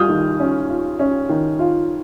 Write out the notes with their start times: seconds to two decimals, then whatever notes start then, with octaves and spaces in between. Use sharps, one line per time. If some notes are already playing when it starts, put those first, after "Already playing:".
Already playing: G3 D#6 F6 G6
0.09 D#3
0.40 C#4
0.69 F4
0.99 C#4
1.29 D#3
1.59 F4